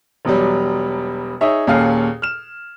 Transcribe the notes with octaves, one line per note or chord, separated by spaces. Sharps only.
E1 B2 F#3 G3
D#4 G#4 C#5 E5
D#2 A#2 C#4 G#4 A4 F5
F6 E7